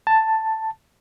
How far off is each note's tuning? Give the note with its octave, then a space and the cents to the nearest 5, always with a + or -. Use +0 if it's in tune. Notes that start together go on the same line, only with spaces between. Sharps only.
A5 +5